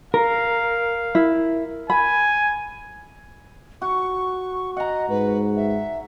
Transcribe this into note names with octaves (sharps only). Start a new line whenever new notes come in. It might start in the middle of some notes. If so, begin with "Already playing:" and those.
A#4 F5
E4
G#5 B5
F#4 C#6
D#5 F#5 A#5
G#2 B4
E5